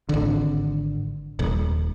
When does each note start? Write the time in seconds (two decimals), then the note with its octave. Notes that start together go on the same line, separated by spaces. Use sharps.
0.09 G#1 D3
1.39 D#1